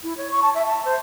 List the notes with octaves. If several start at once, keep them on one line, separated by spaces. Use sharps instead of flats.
E4
C#5
C#6
A5
E5
A5
C5